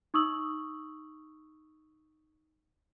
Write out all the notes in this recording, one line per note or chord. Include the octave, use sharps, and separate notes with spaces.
D#4 C#6 D#6 E6 F#7